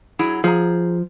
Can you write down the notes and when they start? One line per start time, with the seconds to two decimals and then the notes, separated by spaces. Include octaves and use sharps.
0.19 F#3 E4 G#4
0.44 F3 G#4 A#5